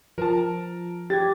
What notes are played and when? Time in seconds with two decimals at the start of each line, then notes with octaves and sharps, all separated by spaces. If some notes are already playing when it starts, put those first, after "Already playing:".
0.18 F3 A#4 A5
1.10 G4 G#6 A6